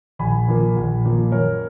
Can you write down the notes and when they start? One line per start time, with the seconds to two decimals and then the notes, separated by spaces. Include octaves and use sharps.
0.19 A#1 G#5 B5
0.48 A#2 F3 A#3
0.76 A#1
1.05 A#2 F3 A#3
1.32 F#2 A#4 C#5